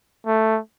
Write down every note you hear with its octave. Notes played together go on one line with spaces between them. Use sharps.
A3